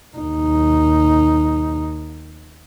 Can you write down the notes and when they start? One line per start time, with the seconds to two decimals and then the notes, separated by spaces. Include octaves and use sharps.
0.17 D#2 D#4